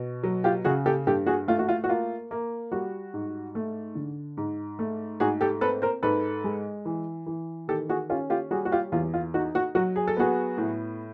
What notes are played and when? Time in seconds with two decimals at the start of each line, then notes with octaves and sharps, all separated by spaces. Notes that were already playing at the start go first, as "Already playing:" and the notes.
Already playing: B2
0.23 F#3
0.44 F4 G4
0.64 C#3 F#4 G#4
0.86 G4 A4
1.07 G2 G4 A4
1.26 F#4 G#4
1.48 A3 F4
1.59 F#4
1.69 F4
1.84 F#4
1.89 A#3 F4
2.31 A#3
2.72 G3 F#4
3.14 G#2
3.55 A3
3.95 D3
4.37 G#2
4.79 A3
5.20 G#2 F#4 G#4
5.41 G4 A4
5.61 C4 A4 B4
5.82 A#4 C5
6.03 G#2 A4 B4
6.44 G#3
6.85 E3
7.26 E3
7.68 D#3 G4 A4
7.89 F#4 G#4
8.09 C#4 F4 G4
8.30 F4 G4
8.51 G3 F#4 G#4
8.65 F#4
8.72 F4 G4
8.92 E2 F4
9.14 F4
9.34 D#4 F#4
9.55 F#4
9.75 F#3 F#4
9.96 G#4
10.08 A4
10.17 B3 F#4 G#4
10.58 A2